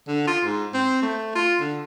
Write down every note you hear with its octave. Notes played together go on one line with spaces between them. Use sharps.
D3
F4
G#2
C4
A3
F4
D3